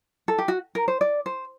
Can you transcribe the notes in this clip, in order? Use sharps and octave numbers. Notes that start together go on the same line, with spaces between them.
A4
G4
F#4
A#4
C5
D5
C5